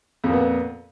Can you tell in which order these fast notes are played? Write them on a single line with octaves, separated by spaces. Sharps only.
F2 A#2 B3